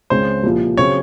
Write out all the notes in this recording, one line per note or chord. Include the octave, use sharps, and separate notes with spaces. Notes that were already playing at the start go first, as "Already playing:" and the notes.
C#2 C#3 G#3 C4 C5
C2 A#2 F3
C#3 F#3 C4 C#5